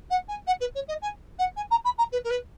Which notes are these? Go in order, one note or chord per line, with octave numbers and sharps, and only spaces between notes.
F#5
G#5
F#5
B4
C#5
D#5
G#5
F#5
G#5
A#5
B5
A#5
B4
A#4
B4